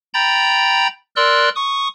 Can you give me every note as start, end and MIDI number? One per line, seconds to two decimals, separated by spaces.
0.14 0.88 79
0.14 0.88 82
0.14 0.88 83
0.14 0.88 91
0.14 0.88 93
1.16 1.49 70
1.16 1.49 74
1.16 1.49 84
1.16 1.49 88
1.16 1.49 90
1.56 1.88 85
1.56 1.88 87